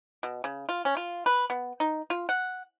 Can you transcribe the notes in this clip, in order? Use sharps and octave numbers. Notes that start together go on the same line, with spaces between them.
B2
C#3
F4
C#4
F4
B4
B3
D#4
F4
F#5